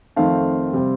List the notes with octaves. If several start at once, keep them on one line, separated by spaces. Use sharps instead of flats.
F2 D#3 A3 C4 F5
C3 G3 C4